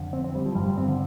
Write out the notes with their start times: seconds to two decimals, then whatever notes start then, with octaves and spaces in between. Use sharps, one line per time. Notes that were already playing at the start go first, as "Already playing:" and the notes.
Already playing: F2 D3
0.13 C4
0.24 C4
0.35 G3
0.46 F3
0.55 G2 D3 G3
0.66 G3
0.78 C4
0.89 D3